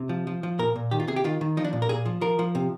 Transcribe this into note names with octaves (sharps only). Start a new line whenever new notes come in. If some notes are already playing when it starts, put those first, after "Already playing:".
Already playing: C3
F3
F3
F3
A#2 A#4
A#2
D#3 G4
F4
C3 G#4
G4
D#3 F4
D#3
F3 D#4
D4
A#2
A#4
A#2 G#4
F3
F3 A#4
F3
C3